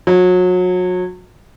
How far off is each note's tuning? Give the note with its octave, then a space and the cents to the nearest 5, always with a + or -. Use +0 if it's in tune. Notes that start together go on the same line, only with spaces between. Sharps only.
F#3 -30